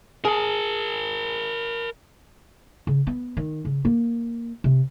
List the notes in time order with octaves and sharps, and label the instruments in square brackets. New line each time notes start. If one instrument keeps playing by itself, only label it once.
[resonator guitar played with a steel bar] G#4 [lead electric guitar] A#4 A5
[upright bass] C#3
B3
D#3
C#3
A#3
C3